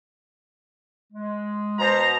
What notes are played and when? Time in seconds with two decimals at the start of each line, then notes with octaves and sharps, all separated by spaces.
1.13 G#3
1.79 B2 C5 A#5